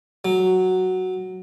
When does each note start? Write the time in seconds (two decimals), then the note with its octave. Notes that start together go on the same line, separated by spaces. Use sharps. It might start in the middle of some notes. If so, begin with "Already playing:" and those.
0.25 F#3